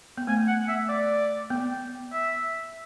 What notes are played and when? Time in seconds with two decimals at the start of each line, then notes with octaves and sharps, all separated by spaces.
0.18 B3
0.27 A3 G#5
0.48 F#5
0.68 E5
0.89 D5
1.50 B3
2.13 E5